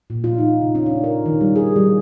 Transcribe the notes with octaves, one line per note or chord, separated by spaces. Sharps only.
A#2
F4
D#4
C#3
C#4
D4
A#4
D#3
G3
G#4
G3